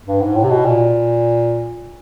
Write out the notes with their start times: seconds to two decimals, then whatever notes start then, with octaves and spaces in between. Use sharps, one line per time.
0.06 G2
0.21 G#2
0.36 A2
0.44 C3
0.50 B2
0.65 A#2